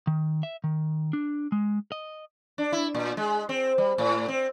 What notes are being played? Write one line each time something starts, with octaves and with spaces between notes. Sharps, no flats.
D#3
E5
D#3
D4
G#3
D#5
D4
E4
A#2
G#3
C4
G3
A2
C4